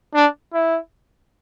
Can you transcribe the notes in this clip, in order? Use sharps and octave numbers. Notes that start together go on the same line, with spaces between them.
D4
E4